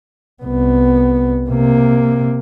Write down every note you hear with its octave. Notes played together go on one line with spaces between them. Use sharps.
C2 B3
C3 A#3